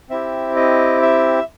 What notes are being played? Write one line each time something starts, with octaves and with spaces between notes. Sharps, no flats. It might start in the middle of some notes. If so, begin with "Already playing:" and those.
C4 E4 G4 E5
D#5
E5